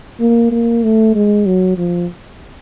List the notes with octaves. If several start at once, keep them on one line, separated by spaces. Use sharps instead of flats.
A#3
A#3
A3
G#3
F#3
F3